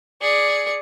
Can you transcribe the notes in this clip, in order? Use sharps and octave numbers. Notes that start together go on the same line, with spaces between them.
G#4 D5 C#7